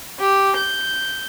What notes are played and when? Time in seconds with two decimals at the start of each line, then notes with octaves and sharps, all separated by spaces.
0.20 G4
0.56 G6